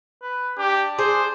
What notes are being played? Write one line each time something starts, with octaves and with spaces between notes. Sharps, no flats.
B4
D4 G4
G#4 C5